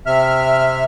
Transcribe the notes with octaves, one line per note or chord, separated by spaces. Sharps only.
C3 E5 F6